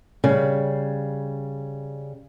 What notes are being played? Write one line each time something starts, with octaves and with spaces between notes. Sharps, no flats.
C#3 G3